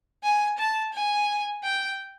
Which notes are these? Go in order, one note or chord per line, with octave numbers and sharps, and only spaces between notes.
G#5
A5
G#5
G5